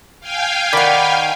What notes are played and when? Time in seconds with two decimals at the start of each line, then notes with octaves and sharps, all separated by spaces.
0.20 F5 G5 G#5
0.73 D#3 D5 F#5 B5